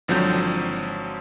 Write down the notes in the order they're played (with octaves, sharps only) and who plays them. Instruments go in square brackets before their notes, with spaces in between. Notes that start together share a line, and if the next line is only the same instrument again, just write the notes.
[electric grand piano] G#1 D3 F3 F#3 C4 G6